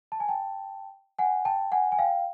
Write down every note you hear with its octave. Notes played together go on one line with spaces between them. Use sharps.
A5
G#5
G5 A5
F#5 G#5
G5 A5
F#5 G#5
G#5
F5 G5